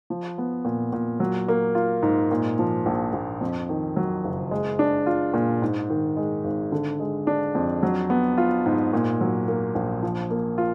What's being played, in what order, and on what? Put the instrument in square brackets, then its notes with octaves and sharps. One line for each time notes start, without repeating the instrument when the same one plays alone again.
[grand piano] F3
B3
A#2
A#2
F#3
A#3
F4
G#2
A#2
F3
A#1
A#1
F2
D#3
F#3
F#1
G#3
D4
F4
A#2
G#2
D#3
G#3
G#1
D3
G#3
D4
F2
F#3
B3
F4
G#2
A#2
F#3
A#3
A#1
F3
A#3
F4